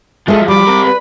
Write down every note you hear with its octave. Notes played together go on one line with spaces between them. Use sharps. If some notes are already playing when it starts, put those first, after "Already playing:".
F3 F#3 G#3 A4 D#5 E5
G3 B5 D6
C4 A#4
B4